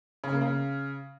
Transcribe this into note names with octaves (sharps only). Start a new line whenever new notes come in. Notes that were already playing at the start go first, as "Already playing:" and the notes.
C#3
A#3
C#3